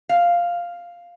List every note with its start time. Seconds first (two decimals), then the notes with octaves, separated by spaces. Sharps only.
0.09 F5